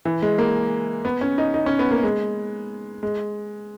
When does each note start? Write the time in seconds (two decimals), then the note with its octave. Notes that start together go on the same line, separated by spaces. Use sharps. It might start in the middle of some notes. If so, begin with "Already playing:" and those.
0.05 E3
0.22 G#3
0.38 A#3
1.05 B3
1.21 C#4
1.38 D#4
1.54 D#4
1.66 C#4
1.79 B3
1.91 A#3
2.03 G#3
3.03 G#3